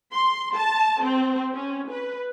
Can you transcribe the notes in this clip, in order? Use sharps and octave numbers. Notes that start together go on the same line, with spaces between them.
C6
A5
C4
C#4
B4